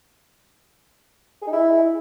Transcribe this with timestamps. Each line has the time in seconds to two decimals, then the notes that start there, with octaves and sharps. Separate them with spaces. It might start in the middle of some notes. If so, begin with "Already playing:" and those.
1.42 G#4
1.47 D#4
1.53 E4